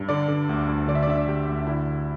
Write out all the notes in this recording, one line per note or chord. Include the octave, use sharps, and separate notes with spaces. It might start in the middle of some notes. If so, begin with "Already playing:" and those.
Already playing: G2
D3 D5
D3
D2
D2
D3 D5
E5
D5
D3 E5
D5
D2 G4
D2
D4
D3 E4
D3